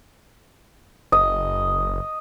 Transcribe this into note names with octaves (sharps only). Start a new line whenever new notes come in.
F#1 D#5